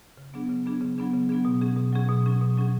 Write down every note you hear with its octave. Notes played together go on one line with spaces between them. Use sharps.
C#3
F#3 B3 D4 G#4
C#3
F#3 B3 D4 G#4
C#3
F#3 B3 D4 G#4
C#3
F#3 B3 D4 G#4
B2
F#3 C#4 G#4
B2
F#3 C#4 G#4
B2
F#3 C#4 G#4
B2
F#3 C#4 G#4